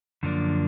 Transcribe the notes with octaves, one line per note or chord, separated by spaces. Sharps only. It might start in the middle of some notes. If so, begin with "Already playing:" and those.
F#2 D3 F3 A#3 D4